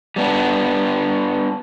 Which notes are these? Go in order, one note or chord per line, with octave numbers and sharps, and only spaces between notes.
G3 B3 D4